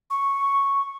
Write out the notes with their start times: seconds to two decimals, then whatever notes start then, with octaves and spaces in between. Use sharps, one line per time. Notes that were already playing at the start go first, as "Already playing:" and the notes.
0.10 C#6